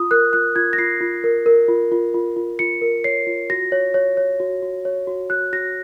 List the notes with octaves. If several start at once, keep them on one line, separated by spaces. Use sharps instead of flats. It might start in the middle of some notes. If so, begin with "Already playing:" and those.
Already playing: F4 D#6
A#4 F#6
F4 F#6
F4 G#6
A#6
F4 C7
F4
A#4
A#4
F4
F4
F4
F4
F4 C#7
A#4
C#5 C7
F4
F#4 A#6
C#5
C#5
C#5
F#4
F#4
C#5
F#4
F#4 F#6
F#4 A#6